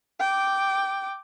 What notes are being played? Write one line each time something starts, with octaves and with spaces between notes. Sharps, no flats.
G5 D6